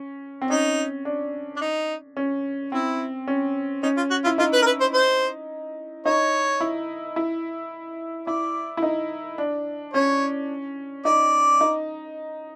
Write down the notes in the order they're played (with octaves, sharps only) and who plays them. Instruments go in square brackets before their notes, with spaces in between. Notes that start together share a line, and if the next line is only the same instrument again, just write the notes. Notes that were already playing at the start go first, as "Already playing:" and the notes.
Already playing: [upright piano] C#4
C4
[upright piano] C#4 [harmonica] D#4
[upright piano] D4
[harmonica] D4
D#4
[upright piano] C#4
[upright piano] C4 [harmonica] E4
[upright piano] C#4
[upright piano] C#4 [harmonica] D#4
[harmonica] F4
F#4
[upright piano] E4 [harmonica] F4
[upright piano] D#4 [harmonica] F4
[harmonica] B4
A#4
B4
C5
C5
[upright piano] D#4 [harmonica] C#5
[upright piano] E4
E4
[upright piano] E4 [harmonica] D5
[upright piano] E4
D#4
D4
[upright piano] C#4 [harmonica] C#5
[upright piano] D#4 [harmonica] D5
[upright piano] D#4